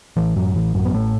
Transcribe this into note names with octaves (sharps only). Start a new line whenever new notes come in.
A1 E3
A1 F#2 F#3
A1 E3
A1 F#2 F#3
B3
A1 A2 A3